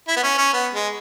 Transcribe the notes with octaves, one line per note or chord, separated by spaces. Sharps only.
E4
B3
C#4
C#4
B3
G#3